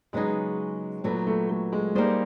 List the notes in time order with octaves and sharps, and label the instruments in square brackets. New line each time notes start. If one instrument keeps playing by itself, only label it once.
[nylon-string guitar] C#3 F#3 B3 D#4 G#4 [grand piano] G#3
[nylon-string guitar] A#2 F#3 B3 [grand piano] A3
[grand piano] A3
A3
G#3
[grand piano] G3 [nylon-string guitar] A#3 D#4 G#4 C5